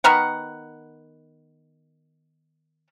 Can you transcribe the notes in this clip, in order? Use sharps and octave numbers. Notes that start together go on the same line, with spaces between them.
D#3 B3 A#4 F#5